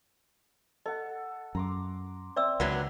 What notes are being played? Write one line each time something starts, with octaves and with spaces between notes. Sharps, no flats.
A4 D#5 F#5
F#2 A#5 C6 D6
C4 D5 E5 E6
C#2 D3 F#3 B3 B4